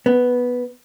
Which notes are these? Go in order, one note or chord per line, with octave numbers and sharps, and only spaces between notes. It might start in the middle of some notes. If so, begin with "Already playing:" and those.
B3